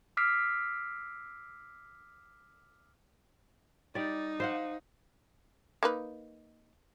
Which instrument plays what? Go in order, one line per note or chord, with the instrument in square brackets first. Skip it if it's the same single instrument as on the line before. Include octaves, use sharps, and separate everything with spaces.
[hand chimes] D6 E6 F6 B6 C7 D7
[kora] G3 D5 [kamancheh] D#4
[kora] C5 F5 F#5
[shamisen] A#3 D#4 B4